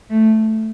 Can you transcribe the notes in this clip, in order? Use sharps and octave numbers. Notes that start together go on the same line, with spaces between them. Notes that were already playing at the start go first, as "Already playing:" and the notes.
A3